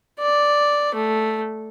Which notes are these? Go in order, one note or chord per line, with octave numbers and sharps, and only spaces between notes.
D5
A3